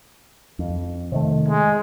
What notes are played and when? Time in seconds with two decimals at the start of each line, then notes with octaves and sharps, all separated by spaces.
0.59 F2
1.12 C3 D#3 A3
1.48 G#3